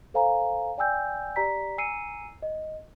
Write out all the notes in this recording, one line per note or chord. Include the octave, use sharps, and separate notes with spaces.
A4 C5 F5 G#5 A#5
D5 G5 G#5 E6 G6
G4 D5 A#5 B6
G#5 A#5 E6 C7 C#7 D#7
D#5